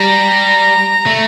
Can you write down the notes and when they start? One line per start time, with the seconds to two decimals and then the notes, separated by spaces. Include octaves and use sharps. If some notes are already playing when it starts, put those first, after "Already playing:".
Already playing: G3 A#5
1.07 A3